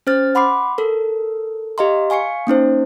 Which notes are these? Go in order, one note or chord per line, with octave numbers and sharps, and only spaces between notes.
C#4 C5 F6 A6
F#5 B5 C6 D6 C7
A4 A#4
G4 D#5 F5 A#5 C6
F5 G#5 C#6 C7 C#7
A#3 C#4 D#4 C5